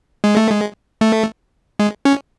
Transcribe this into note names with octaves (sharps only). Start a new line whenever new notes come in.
G#3
A3
G#3
A3
G#3
C#4